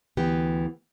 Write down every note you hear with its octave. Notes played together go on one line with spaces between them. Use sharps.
D2 E3 B3 G4